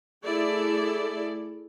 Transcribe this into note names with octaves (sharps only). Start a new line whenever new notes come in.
A3 E4 G#4 A4 D5